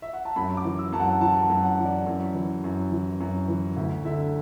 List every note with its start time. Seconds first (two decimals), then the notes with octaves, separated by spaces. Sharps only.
0.02 E5
0.13 F#5
0.25 A5
0.36 F#2 B5
0.57 D6
0.65 E3
0.79 E6
0.92 F#2 A5
1.00 F#5
1.21 E3 A5
1.42 A5
1.50 F#2
1.63 F#5
1.78 E3
1.85 D5
2.06 F#2
2.35 E3
2.64 F#2
2.91 E3
3.20 F#2
3.48 E3
3.76 D2 E5
4.05 D3 E5